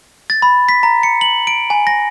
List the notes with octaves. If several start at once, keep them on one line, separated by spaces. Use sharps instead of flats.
A6
B5
B6
A#5
C#7
F#7
D7
G#5
A#6